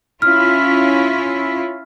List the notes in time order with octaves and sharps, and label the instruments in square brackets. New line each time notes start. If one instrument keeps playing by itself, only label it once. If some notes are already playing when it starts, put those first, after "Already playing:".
[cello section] C#4 E4 F4 [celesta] F6